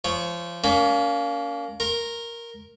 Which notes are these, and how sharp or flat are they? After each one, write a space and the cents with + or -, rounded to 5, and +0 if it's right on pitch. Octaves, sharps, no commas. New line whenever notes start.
F3 -25 C#5 +0
A#3 +0 C#4 +35
A#4 +0 C6 +45